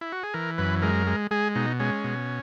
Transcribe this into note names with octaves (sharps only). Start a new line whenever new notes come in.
E4
F#4
G#4
E3 A#4
F#2 B4
G#3 A#4
G#3
G#3 G#4
B2 D#4
G#3 C#4
B2